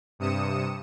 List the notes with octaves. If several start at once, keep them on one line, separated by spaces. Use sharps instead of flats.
G2 C3 D#6 C#7 E7